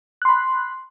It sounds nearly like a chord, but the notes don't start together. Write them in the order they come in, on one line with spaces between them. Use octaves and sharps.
F#6 C6 B5